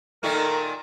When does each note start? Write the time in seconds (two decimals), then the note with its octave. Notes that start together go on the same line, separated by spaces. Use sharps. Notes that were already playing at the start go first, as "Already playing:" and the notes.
0.23 A#2 D#3 A3 D#4 A#4